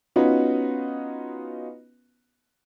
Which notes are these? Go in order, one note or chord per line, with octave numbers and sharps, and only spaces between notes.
B3 C#4 D#4 F4 F#4 B4